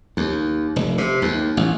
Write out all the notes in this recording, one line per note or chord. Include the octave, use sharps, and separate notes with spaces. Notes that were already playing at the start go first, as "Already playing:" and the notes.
D#2
F1
C3
D#2
A1